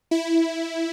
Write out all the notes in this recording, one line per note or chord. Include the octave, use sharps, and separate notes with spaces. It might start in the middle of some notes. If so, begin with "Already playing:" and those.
E4